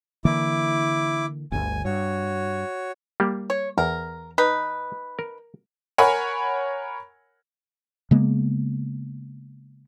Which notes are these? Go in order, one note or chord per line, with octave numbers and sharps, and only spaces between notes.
D3 E3 A#3 E4 D6
G1 D2 G#5
G2 F#4 C#5
G3 A#3 G4
C#5
E2 A#4
D#4 B4
A#4
A#4 C#5 F#5 G#5 B5
C#3 G#3 A#3 B3